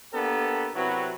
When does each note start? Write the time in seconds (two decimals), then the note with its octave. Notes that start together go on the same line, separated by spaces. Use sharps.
0.14 A#3 B3 D4 G4 A4 A#4
0.75 C3 F#3 C4 E4 F#4 B4